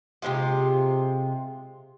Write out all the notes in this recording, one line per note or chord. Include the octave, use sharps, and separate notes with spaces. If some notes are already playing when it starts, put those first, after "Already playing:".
C3 F3 G#3 F4